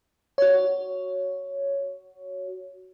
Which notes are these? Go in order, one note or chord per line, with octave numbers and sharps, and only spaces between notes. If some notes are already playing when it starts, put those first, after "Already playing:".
F#4 C#5